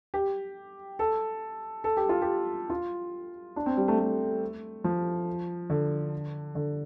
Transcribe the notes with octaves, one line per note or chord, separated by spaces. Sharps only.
G4
A4
A4
G4
F4
G4
F4
D4
C4
G3
A3
A3
F3
D3
D3